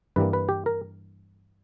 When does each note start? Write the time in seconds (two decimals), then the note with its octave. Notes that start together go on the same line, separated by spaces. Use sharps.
0.16 G2 E3 G3 A#3 B4
0.33 B4
0.49 G4
0.66 A#4